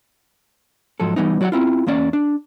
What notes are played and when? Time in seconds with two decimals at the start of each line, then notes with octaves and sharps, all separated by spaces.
1.00 G#2 F3 F#3 A4
1.16 E3 G3 B3 D#4
1.41 F#3 F#4 D5 D#5 F#5
1.52 C4 E4 F4
1.87 E2 A#3 C#4 D5
2.13 D4